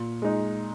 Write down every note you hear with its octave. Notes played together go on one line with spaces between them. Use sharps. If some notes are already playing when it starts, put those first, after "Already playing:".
Already playing: A#2
G#3 D#4